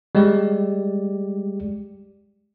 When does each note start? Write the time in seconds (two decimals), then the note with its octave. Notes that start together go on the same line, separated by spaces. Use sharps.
0.15 G3 G#3 G4 D5